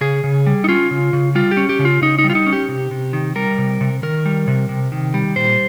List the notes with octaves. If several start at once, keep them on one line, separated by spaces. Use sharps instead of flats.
C#3 G#4
C#3
G3
D#4
C#4 F4
C#3
C#3
G3 F4
G4
C#4
G4
C#3
F4
C#3 D#4
D#4
G3
F4
D#4
C#4
G4
C3
C3
D#3
G3 A#4
C3
C3
D#3 A#4
G3
C3
C3
D#3
G3
A#2 C5